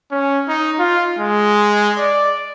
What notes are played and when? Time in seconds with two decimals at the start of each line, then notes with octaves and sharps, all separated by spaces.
0.11 C#4
0.48 D#4
0.79 F4
1.19 G#3
1.98 D5